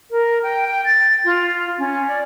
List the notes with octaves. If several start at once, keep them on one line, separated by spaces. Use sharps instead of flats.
A#4
G5
G5
A6
F4
C#4
D5